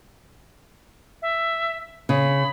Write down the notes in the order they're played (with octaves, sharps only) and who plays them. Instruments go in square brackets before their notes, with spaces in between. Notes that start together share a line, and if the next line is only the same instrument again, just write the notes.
[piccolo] E5
[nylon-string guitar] C#3 [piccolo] B5